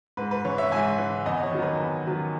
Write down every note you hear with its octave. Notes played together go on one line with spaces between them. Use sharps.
G#2 B4
B4
E3 C#5
C#5 E5
G#2 E5 G#5
E3
E2 D#5 F#5
C#5
D#3 F#3
B4
E2
D#3 F#3